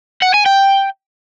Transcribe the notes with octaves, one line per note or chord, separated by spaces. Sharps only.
F#5
G#5
G5